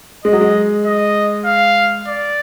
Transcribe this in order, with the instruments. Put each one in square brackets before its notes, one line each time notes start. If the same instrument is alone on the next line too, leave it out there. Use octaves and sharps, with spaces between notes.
[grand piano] G#3 [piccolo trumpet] D#5
[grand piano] F#3
G#3
[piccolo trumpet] D#5
F5
D5